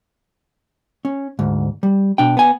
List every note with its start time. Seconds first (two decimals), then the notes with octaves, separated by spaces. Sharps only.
1.05 C#4
1.39 D2 G#2
1.83 G3
2.18 B2 D4 G5
2.37 B3 G#5